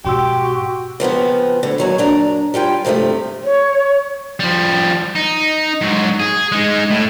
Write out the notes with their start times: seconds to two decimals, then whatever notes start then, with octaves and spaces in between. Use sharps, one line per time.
0.05 G#2 B2 F#4 G4 G5 C6 E6
1.00 C#3 F3 B3 C4
1.63 D2 D3
1.78 D#2 F#3 G#5
1.98 F#2 D4 A#5
2.54 G3 F4 G5 G#5
2.85 G2 C3 F3 G3 A3
3.44 C#5
4.40 F3 G3
5.15 D#4
5.81 G#2 F#3
6.19 G#4
6.52 G#3 D#4
6.91 A2